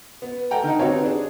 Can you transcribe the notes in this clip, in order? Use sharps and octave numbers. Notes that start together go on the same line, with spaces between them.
B3
A4 F#5 G5 A#5
D#3 D#4
C4 D#4 F#4 G4 B4 C#5
D4 G#4